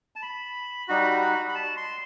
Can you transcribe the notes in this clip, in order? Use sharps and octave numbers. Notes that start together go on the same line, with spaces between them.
A5
B5
G3 D#4 F#4
B5
A5
C6